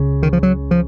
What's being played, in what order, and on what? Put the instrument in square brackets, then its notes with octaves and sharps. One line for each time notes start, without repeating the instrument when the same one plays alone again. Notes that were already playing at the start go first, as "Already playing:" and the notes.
Already playing: [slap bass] C#2 C#3
D#3
F3
F#3
F3